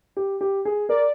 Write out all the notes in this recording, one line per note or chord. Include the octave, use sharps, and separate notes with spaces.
G4
G4
G#4
A#4 D5